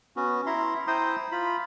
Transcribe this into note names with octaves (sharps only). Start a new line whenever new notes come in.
B3 C#4 F#4
E4 E5 A#5 C6
E4 C5 G5 A#5 C6 D#6
F4 B5